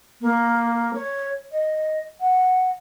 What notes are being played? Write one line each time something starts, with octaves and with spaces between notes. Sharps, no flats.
A#3
C#5
D#5
F#5